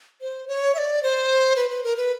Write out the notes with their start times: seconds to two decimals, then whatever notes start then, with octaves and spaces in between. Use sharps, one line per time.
0.22 C5
0.48 C#5
0.75 E5
0.78 D5
1.03 C5
1.56 B4
1.70 B4
1.84 A#4
1.97 B4